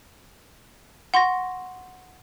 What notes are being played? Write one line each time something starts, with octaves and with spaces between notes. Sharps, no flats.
F#5 C6 C#6 A#6